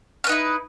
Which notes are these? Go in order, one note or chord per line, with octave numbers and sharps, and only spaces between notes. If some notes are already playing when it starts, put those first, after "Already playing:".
C#4 D#4 E4 B4